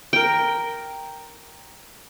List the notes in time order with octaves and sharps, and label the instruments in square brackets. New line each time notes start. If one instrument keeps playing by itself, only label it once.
[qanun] A#4 G5